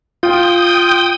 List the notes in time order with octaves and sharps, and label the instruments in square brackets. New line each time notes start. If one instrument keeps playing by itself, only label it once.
[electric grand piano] F4 [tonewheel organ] G5 D#6